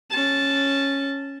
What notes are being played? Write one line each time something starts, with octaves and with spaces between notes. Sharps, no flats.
C#4 A5